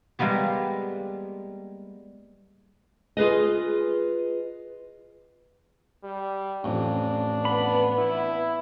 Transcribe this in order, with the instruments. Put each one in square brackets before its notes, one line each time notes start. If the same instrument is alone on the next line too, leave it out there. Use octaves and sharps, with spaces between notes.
[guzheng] G3 G#3 A#3 B3 G4
[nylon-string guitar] F4 G#4 B4 D#5
[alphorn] G3
[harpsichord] A1 F2 [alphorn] D4
[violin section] B3 [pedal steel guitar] B5
[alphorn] E4